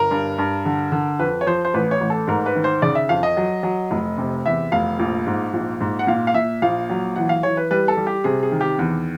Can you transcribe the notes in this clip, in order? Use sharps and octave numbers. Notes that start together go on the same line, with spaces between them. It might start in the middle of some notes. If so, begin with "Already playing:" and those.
Already playing: G1 A#4
G2
G2
D3
D3
F2 B4
C#5
F3 C5
C5
A1 B4
C#5
A1
A4
G#2 A#4
B4
D#3
C5
C#3 D5
E5
F2 F5
D#5
F#3
F#3
F1
C3
E2 E5
F1 F5
A#1
G#2
A#1
G#2
F#5
A#2 F5
F5
A#2 E5
A#1 F5
F#3
E3 F#5
F5
E3 C#5
B4
G3 B4
A4
G3
G4
C3 G#4
G#4
D#3
G4
E2